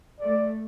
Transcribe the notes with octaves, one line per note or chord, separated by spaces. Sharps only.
A3 D5